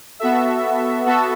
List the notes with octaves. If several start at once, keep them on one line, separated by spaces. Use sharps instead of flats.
B3 F#4 A4 E5
B3 F#4 A4 E5